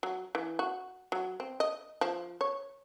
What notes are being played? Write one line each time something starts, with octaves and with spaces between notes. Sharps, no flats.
F#3
E3
F#4
F#3
C4
D#5
F3
C#5